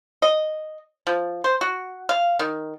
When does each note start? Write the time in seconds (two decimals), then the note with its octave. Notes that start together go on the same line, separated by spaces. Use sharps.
0.22 D#5
1.07 F3
1.44 C5
1.61 F#4
2.09 F5
2.39 D#3